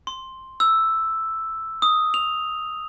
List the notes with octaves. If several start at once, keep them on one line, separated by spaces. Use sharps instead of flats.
C6
E6
D#6
F7